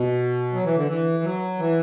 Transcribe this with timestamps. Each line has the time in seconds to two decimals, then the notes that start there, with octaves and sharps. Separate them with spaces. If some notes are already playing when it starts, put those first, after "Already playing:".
Already playing: B2
0.53 F#3
0.64 E3
0.76 D3
0.88 E3
1.24 F#3
1.59 E3